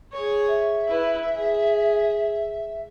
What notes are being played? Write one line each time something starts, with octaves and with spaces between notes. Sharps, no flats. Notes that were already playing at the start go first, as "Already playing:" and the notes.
G#4 C#5
E5
E4 B4
G#4